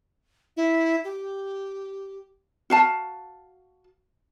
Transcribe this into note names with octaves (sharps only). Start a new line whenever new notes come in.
E4
G4
F#4 F5 A5